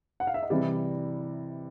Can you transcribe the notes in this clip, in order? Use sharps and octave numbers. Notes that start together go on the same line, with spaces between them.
F#5
F5
E5
D#5
C3 E3 G3 D5